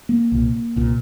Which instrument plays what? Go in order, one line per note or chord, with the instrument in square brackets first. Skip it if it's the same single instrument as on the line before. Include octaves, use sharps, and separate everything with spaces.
[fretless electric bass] A#3
C2 A#2
C2 A#2